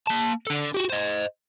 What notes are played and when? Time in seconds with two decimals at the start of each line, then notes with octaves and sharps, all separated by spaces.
0.07 A#3 A5
0.47 D4 A4
0.74 F#4 G4
0.90 C5 D#5